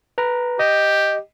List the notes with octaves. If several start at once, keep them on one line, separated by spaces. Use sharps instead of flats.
B4 A#5
G4 D#5